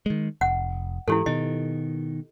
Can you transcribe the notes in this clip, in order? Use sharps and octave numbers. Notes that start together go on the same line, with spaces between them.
D#3 G#3
F1 F#5
G#2 E3 E4 G4 A4
B2 D#3 D#5